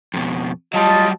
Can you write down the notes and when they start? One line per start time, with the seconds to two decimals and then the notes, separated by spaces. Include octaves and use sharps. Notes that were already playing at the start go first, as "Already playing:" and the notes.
0.14 F2 B2
0.74 F#3 G3 F4 D#5 A5